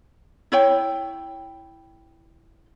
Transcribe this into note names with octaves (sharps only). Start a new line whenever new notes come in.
E4 C#5 G5